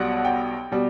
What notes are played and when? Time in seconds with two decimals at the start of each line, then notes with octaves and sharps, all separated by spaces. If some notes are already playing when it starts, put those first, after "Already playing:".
Already playing: B1 B2 G3 F#5
0.25 G5
0.72 B2 G3